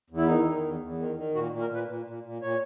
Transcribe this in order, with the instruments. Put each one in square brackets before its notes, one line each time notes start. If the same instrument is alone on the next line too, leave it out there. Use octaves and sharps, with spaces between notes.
[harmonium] E2
E4
D#3 D#4
D#3
E2
E2
D#3
D#3
A#2 F#4
A#2
A#4
A#2 B4
A#2
A#2
A#2
A#2 C#5